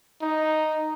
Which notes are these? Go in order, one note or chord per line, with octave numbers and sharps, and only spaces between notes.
D#4